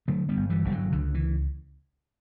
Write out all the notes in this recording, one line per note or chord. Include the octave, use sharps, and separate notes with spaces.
D3 F#3 A3
G3 B3
G1
E3 G3
G1 G3
D3 F#3
C#2 D3
E3